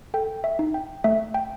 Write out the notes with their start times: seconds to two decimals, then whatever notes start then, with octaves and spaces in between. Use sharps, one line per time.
0.14 A4 G5
0.44 E5
0.59 D#4
0.74 G5
1.04 A3 E5
1.34 G5